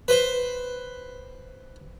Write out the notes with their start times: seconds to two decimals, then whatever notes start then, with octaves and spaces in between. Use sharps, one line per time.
0.08 B4 C5